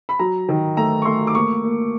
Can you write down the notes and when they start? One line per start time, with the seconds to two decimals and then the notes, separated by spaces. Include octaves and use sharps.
0.09 B5
0.19 F#3 A#5
0.49 D#3
0.77 A3 A#5
1.02 C#6
1.05 A3 C6
1.27 D6
1.35 A#3 C#6
1.64 A#3